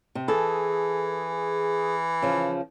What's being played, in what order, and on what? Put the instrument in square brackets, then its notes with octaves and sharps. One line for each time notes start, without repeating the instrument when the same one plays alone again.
[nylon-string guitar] C3
[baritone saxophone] E3 [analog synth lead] G#4 [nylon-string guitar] A4
[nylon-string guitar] C#3 F3